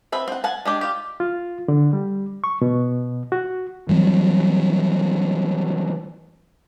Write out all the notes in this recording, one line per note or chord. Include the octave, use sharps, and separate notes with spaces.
C4 B4 E5
C4 F#5
F#5 G#5 A5
G#3 D4 G4
F4 G4
F4
D3
G3
C#6
B2
F#4
E3 F#3 G3 C4